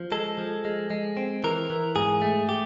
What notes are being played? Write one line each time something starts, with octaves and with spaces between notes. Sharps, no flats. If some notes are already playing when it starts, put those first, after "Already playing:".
Already playing: F3
G#3 A4
F3
G#3
G#3
C4
E3 A#4
E3
G#2 G#4
A3
G4